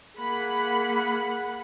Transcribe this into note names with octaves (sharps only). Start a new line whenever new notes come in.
A#3 G#4 F#5 B5